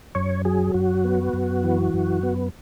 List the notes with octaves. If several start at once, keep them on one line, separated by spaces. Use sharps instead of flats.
F#2 C#5
F#3 G#4
F#2 F#4
B3
F#2
E3
F#2
B3